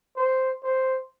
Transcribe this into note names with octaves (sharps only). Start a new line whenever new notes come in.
C5
C5